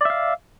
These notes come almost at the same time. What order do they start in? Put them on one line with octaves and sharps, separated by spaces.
D5 E5 F5